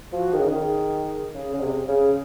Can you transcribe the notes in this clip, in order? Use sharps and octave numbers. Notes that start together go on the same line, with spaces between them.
F3 F#4
D#3 G#4
C#3
D#3
C#3 G#4
C#3
C3
C#3